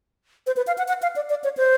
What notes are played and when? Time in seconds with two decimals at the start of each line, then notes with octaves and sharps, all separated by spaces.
0.47 C5
0.57 B4
0.67 F5
0.78 F#5
0.88 F#5
1.02 F5
1.16 D5
1.30 D5
1.44 C#5
1.57 C5